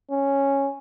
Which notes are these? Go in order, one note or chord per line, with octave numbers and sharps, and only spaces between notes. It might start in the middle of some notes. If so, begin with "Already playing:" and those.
C#4